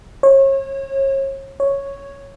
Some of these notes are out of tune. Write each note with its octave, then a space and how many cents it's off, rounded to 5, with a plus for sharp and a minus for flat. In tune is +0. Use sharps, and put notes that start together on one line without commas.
C#5 -35
C#5 +0